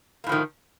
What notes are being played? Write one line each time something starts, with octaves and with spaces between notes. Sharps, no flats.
A2 D#3 F3 A#3